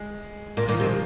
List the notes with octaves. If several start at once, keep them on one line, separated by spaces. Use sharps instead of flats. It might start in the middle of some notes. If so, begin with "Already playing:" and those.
Already playing: G#3
A#2 A#3
D#3
A#2
F3
C3
G#3